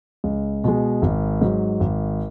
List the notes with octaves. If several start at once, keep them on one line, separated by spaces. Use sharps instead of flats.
C#2
B2 G#3
G#1
G#2 F#3
G#1